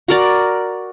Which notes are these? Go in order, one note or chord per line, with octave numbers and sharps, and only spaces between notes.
F#4 A#4 D5